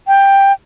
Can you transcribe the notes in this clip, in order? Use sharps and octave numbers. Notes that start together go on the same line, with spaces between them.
G5